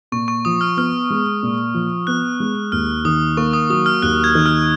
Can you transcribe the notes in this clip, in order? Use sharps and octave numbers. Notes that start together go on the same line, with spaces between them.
A#2 C#6
C#6
F3 D#6
F6
B3 F6
G#3
A#2
F3
B3 F#6
G#3
D#2 F6
D#3 D#6
A#3 C#6
D#6
F#3 D#6
F6
D#2 F#6
G#6
D#3
F6